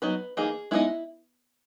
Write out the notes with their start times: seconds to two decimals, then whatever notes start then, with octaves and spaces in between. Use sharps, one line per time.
0.02 F#3 B3 D#4 B4
0.37 E3 A#3 D#4 G#4
0.71 G#3 B3 D#4 E4